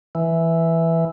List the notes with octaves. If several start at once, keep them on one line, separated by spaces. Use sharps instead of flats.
E3